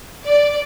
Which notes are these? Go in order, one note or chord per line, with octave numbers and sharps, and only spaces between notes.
D5